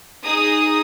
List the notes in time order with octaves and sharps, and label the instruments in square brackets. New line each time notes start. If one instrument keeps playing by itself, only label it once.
[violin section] D#4 G#4 D#6